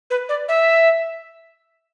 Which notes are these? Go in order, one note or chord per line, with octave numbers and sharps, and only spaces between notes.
B4
D5
E5